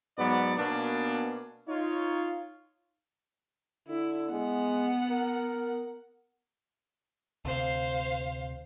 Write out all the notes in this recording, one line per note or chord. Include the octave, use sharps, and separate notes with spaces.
G#2 F#3 B3 D5
B2 A#3 B3 C#4 D4
D#4 F4 C#5
D3 E4
G#3 B3 F#5
A#4
D2 C3 C5 F5